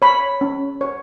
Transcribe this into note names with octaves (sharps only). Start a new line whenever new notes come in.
C#5 B5
C#4
C#5